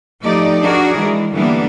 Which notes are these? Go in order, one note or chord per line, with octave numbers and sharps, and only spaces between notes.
F3 A3 D#4 G4 D5
D4 F#4 G#4 A#4 D5
E3 G#3
D3 E3 G3 A#3 B3 D4